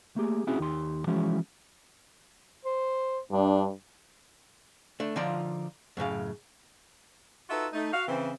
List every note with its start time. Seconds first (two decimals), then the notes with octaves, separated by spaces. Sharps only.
0.16 A3 A#3 G4 G#4
0.47 C4 C#4 E4 F#4 G#4
0.59 D#2 D#4 G4 C6
1.07 E3 F3 G#3 C#4 E4 F#4
2.65 C5
3.31 G2 D4
5.00 A3 D4
5.16 D3 F3 D#4 F4 D5
5.97 F#2 A2 C#3 F5
7.50 D#4 F4 F#4 A4 B4 E5
7.73 A3 D#4
7.93 F#4 F5
8.07 C#3 E3 C4